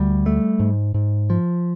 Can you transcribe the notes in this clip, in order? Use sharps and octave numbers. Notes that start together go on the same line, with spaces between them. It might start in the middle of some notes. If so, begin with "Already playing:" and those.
Already playing: D2 G3
A3
G#2
G#2
F3